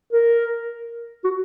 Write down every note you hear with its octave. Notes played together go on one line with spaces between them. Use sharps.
A#4
F#4